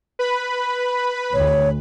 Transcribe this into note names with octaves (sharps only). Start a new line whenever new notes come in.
B4 B5
D2 C#5